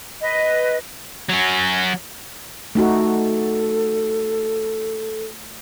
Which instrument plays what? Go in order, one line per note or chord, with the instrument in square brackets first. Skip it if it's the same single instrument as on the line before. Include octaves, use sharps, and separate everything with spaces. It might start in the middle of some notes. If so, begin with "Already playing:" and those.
[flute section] B4 D#5
[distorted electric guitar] F#3 C#4
[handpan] A3 D#4 F#4 [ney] A4